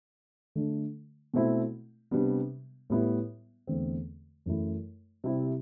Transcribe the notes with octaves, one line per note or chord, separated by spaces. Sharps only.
D3 A3 D4
B2 A3 C4 E4
C3 G3 B3 D4
A2 G3 B3 E4
E2 D3 A3 C4
F#2 E3 A3 E4
C3 G3 C4 E4